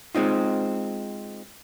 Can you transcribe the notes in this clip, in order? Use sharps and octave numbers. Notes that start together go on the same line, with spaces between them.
G#3 C4 D#4 F4